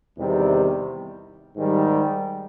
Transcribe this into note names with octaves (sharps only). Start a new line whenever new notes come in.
E2 C3 D#3 G3
G#2 D#3 G3